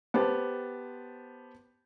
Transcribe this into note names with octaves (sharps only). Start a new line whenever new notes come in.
B3 G4 C5 A5